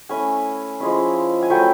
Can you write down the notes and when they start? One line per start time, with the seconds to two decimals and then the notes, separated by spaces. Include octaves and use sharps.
0.09 A3 C#4 E4 G#5
0.80 F3 G#3 C#4 E4
1.42 G#5
1.50 F#3 A3 C#4 E4 G5